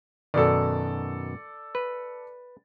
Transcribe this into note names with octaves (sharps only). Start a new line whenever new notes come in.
F#2 B2 D#3 A4 D5
B4